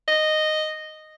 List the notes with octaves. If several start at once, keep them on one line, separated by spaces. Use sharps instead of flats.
D#5